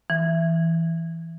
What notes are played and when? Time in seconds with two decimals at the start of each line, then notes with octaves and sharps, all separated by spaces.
0.10 E3